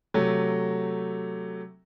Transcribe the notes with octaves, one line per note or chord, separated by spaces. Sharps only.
C3 F#3 A3